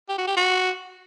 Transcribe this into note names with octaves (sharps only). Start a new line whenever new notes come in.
G4
F#4
G4
F#4